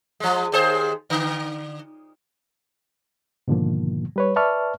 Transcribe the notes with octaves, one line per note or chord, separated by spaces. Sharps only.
F3 G#3
D#2 G#4 C5
D3
G#2 B2 D3 D#3 F3 A#3
G3 B4 C#5
B4 D5 E5 A5 C#6 F6